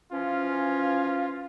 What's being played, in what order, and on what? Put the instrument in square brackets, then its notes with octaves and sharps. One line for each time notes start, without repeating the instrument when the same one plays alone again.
[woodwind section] E3 F3 C#4 [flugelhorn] F4